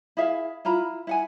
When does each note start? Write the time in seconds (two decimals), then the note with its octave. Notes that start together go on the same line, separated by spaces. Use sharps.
0.17 E4 G#4 E5 F5
0.65 E4 F4 A#5 B5
1.07 E4 F#5 G#5